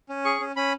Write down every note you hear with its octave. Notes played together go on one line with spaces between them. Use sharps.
C#4
G#4 C#6
C#4
C#4 B5